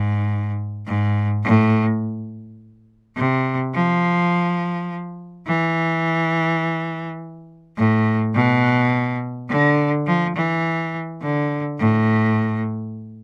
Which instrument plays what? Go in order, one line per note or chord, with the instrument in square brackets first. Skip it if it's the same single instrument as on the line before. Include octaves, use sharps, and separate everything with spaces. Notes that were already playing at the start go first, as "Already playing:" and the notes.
Already playing: [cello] G#2
G#2
A2
C3
F3
E3
A2
B2
D3
F3
E3
D3
A2